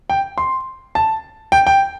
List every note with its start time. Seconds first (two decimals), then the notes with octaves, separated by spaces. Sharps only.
0.10 G5
0.38 C6
0.95 A5
1.52 G5
1.67 G5